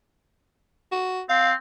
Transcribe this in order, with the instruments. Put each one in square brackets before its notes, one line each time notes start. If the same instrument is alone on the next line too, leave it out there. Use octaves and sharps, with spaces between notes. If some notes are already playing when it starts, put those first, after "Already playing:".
[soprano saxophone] F#4
[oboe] C4 [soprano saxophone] F5